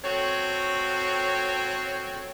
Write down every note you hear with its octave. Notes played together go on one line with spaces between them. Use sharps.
C4 F#4 A4 C#5